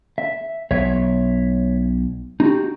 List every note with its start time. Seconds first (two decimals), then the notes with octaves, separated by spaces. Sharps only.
0.18 E5
0.71 B1 B2 C#5 E5
2.40 D#4 F#4 G4